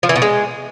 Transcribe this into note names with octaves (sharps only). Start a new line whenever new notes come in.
F3
E3
B2
G#3